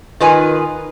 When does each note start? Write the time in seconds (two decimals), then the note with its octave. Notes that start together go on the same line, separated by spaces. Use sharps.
0.20 D#3 F4 B4 G#5